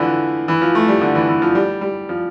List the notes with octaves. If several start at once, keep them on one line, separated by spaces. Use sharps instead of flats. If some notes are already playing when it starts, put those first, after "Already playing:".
Already playing: D3 E3 F3
E3
F3
A3
G3
D3
E3
E3
F3
G3
G3
F3